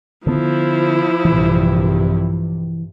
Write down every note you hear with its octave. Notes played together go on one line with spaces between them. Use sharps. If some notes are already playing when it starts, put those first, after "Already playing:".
D3 F3 B3 E4
A#1 G2 C3 E3